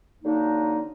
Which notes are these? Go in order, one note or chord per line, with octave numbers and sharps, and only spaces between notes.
D3 F#3 A#3 D4 D#4